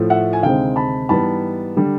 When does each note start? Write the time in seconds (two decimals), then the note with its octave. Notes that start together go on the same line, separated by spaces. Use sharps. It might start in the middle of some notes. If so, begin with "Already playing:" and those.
Already playing: A2 F3 A3
0.10 E5 F#5
0.33 G#5
0.43 D2 C3 D#3 G#3 C4 F5 G5
0.76 A5 B5
1.09 G#2 E3 G3 B3 A5 B5
1.77 D3 G3